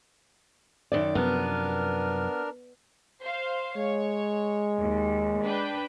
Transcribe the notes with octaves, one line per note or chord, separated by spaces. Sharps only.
F#2 D#3 D5
F#2 C3 F3 B3 D4 A#4 F6
C5 F5
G#3 C#5
D#2
D4 B4 G5